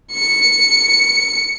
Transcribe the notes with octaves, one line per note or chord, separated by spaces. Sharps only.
C#7